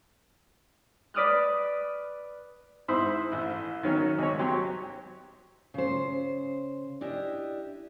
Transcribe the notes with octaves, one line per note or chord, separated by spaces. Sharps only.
B4 D5 D#6 F6 F#6
G#2 E4 C5 B5 C6 D#6
A1 E4
D#3 F#3 C#4
C#2 C#5
F#3 G4 C#5 C6
C#3 C5
D4 E4 G4 D#5